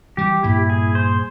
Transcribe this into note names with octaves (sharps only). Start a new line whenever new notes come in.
E3 G3 G4
G2 A#2 E4
G#4
C5